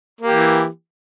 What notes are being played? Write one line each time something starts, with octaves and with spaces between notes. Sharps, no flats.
E3 A#3 G4